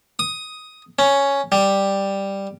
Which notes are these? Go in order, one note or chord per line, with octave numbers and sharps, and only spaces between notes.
D#6
C#4
G3